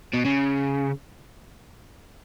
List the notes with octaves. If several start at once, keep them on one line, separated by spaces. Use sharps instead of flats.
B2
C#3